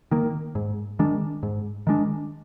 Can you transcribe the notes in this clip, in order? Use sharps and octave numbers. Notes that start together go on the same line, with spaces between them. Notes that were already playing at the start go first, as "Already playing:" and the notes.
D#3 A#3
G#2
D#3 G#3 D4
G#2
D#3 G#3 D4